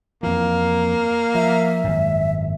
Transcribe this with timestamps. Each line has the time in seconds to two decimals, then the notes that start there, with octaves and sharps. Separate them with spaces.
0.23 F2 E3 A#3
1.35 F3 E5
1.84 G#1 F#2